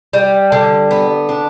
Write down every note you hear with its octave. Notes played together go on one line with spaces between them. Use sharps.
G3
D3
B3
D4